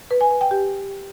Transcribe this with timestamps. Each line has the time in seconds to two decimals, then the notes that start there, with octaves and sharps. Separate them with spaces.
0.11 B4
0.21 G#5
0.31 B4
0.41 G5
0.51 G4